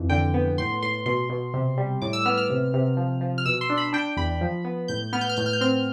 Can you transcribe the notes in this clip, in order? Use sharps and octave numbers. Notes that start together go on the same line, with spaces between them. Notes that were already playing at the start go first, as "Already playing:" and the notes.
Already playing: F2 E3
D3 G5
B3
A2 C6
A2 C6
B2 C6
B2
C3
G3
A2 D6
E6
B3 F6
F6
C3
C3
F3
F3
F6
B2 E6
C6
D4
B5
D4 G5
E2 B5
F3
B3
A2 G6
B3 F6
G6
F6
A2 G6
F6
G6
C4 F6